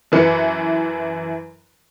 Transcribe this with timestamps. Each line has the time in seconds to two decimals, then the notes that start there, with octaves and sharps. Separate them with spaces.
0.12 F#2 E3 B4 C#7